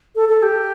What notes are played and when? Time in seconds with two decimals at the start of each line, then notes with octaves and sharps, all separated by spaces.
0.15 A4
0.29 A4
0.42 G4